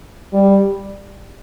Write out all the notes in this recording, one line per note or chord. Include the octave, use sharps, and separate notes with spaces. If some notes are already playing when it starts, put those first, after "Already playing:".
G3